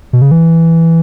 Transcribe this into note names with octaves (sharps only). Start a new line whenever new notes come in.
B2
C#3
E3